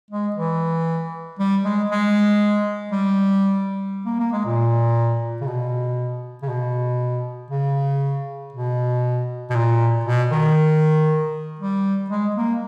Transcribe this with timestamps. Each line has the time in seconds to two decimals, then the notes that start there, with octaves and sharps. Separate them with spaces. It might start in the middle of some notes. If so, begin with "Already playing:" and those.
0.11 G#3
0.36 E3
1.39 G3
1.65 G#3
1.90 G#3
2.91 G3
4.06 A#3
4.19 A#3
4.33 G#3
4.45 A#2
5.41 C#3
5.47 B2
6.42 C#3
6.49 B2
7.50 C#3
8.53 B2
9.50 B2
9.55 A#2
10.05 B2
10.31 D#3
11.59 G3
12.10 G#3
12.36 A#3